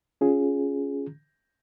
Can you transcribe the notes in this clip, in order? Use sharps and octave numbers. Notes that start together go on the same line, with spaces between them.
C#4 F4 G#4